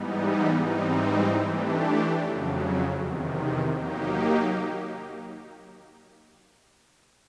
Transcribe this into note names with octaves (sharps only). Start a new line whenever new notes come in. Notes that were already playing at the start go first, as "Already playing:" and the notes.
Already playing: G#2 E3 G3 B3 D#4
G#2 E3 G3 C4 D#4
E3 A3 D4 G4
F2 C#3 F#3
E2 C3 D#3
F#3 A#3 D#4 G4